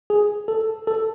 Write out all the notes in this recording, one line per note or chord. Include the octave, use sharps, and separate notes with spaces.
G#4
A4
A4